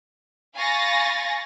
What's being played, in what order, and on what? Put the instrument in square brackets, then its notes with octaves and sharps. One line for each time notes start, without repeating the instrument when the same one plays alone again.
[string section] F5 G#5 B5 C#6 A6 A#6